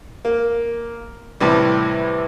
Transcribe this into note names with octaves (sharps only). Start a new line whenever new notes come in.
A#3
A2 C3 E3 G3